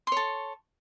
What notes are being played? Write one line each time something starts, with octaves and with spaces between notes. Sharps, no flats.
A4 C#5 C6